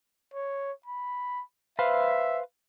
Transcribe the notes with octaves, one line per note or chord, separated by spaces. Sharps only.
C#5
B5
B4 C5 E5 F5